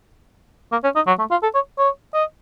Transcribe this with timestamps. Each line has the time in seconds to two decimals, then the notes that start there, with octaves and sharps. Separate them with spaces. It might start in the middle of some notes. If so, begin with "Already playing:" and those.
0.72 A#3
0.84 C#4
0.96 D#4
1.07 F#3
1.19 A3
1.31 F4
1.43 A4
1.54 C#5
1.78 C#5
2.14 D#5